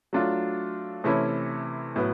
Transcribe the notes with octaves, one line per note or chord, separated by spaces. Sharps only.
F#3 A3 D4 F4
C3 E3 A3 C#4 E4
A2 F#3 B3